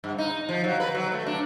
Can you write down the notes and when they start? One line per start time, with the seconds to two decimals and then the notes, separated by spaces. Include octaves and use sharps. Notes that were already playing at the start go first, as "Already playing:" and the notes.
0.04 G2
0.18 D#4
0.49 F3
0.64 F#3
0.80 B4
0.94 F#3
1.12 A3
1.26 D4